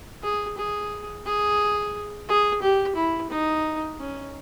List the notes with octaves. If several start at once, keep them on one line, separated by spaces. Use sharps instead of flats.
G#4
G#4
G#4
G#4
G4
E4
D#4
C#4